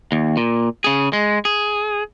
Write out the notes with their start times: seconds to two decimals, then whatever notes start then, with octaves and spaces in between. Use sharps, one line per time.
0.12 D#2
0.37 A#2
0.84 C#3 G#4
1.13 G#3
1.45 G#4